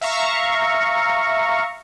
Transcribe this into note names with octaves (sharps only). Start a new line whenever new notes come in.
E5 F5 A#5 C#6